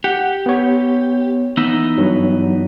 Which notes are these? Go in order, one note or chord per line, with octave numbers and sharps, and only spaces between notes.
G4 F#5
B3 C#5
E3 B3 D#4 E6
G2 F#3